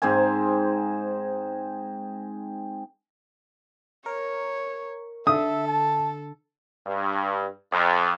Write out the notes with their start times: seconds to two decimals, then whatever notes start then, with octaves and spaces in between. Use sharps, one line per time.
0.02 G#2 C4 C5 G#5
4.06 A#4 C#5
5.27 D3 A4 E5 D#6
5.68 A5
6.86 G2
7.72 F2